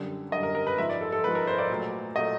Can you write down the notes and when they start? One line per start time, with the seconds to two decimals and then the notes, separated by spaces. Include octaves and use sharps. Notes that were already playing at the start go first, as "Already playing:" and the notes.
Already playing: F#2 D3 G3
0.32 F#2 D3 G3 D#5
0.43 A#4
0.55 A#4
0.67 B4
0.78 G#2 F3 G#3 E5
0.89 D5
1.01 A4
1.12 A4
1.24 G#2 F3 G#3 B4
1.35 A#4
1.47 C5
1.58 D5
1.69 A#2 F#3 A3
2.16 A#2 F#3 A3 D#5